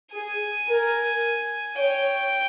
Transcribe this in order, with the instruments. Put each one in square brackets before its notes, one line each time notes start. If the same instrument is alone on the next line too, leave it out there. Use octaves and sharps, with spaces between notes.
[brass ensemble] G#4 [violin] G#5
[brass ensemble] A#4
[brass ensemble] C#5 [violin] G5